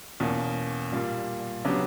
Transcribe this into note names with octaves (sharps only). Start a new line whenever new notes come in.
E2 B2 A#3 C#4
A#2 G3 A#3
C#3 F#3 B3 D4 G4